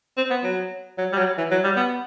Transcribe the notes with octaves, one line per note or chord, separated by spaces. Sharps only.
C4
B3
F#3
F#3
G3
F#3
E3
F#3
G3
B3